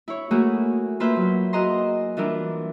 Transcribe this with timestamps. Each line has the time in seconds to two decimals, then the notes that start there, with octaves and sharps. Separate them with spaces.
0.08 E4 C#5
0.31 A3 A#3 E4 F#4 G#4
1.00 A#3 F4 B4 C5 E5
1.16 F#3
1.53 E4 F#4 G#4 D#5 A#5 C6
2.17 E3 G3 D4 E4 F4 A#4